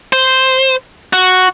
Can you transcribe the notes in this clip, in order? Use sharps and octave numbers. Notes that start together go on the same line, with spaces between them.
C5
F#4